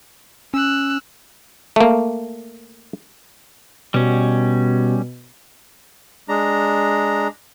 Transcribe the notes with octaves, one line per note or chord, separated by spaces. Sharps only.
C#4 E6 F#6
A3 A#3
B2 G3 C#4
G#3 D4 A#5